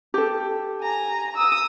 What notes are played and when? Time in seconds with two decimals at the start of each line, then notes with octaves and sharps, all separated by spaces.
0.14 G4 A4
0.80 G#5 A#5
1.36 D#6 E6